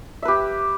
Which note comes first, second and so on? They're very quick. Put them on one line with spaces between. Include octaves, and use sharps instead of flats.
E5 B4 G4